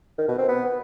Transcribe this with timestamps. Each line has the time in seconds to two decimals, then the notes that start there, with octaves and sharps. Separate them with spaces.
0.18 D#3
0.28 B2
0.38 C4
0.48 B3